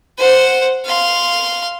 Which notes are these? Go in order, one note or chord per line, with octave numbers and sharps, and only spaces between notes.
C5 F#5
F5 C6